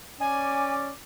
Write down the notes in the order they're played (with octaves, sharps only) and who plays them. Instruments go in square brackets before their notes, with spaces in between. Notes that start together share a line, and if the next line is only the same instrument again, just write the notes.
[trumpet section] C#4 D5 D6 [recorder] G#5